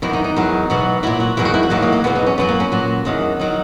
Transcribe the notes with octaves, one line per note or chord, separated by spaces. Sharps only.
E2 D#3 F#3 E4
D#4
D#4
E2 D#3 F#3
E2 B2 F#3
A#2 F#3 E4
F#4
E2 D#3 F#3 E4
F#4
E4
F#4
E2 D#3 F#3 A#3
A#3
A#3
E2 B2 F#3 B3
D#4
C#4
F#2 D#3 F#3 B3
A#3
C#4
A#2 F#3
E2 D#3 F#3
D#3 F#3 D#4